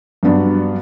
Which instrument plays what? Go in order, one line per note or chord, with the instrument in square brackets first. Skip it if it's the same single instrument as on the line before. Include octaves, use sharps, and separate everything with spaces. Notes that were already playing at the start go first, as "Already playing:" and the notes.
[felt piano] G2 F#3 B3 D4